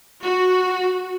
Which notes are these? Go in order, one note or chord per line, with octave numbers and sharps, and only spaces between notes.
F#4